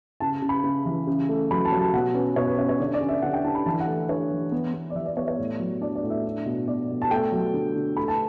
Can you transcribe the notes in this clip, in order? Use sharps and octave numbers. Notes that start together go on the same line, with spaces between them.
C#3 A5
C#3
B5
C#3
E3
C#3
A3
F#3 B5
A5
F#3
A5
B2 F#5
C#4 B4
B2 C#5
B4
C#4 C#5
C#5
D3 D5
D5
C#4
E5
D3 F#5
G5
D3 A5
B5
E3 A5
F#5
A3
D4 C#5
E3
B3
B3
D5
E3 E5
D5
B3 C#5
C#5
A2
F#3
D4 D5
D5
A2
E5
D4
B2
B2 D5
B2
A5
A3 G5
F#3
D3
D3
A3 B5
A5